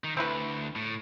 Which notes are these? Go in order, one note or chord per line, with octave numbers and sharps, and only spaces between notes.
D#3
D2 C4 E4 B4
A2